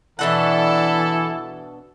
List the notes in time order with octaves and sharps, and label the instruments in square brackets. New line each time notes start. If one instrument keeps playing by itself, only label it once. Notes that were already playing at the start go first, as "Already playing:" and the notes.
[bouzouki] B2 D4 F#5 [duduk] E3 [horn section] E4 A4